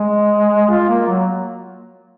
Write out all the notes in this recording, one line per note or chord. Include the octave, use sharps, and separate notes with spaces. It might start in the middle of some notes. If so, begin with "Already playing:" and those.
Already playing: G#3
F4
A#3
F#3